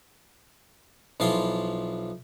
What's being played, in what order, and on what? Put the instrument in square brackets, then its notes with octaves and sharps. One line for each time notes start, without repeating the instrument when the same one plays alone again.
[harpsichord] B1 E3 F3 F4 C6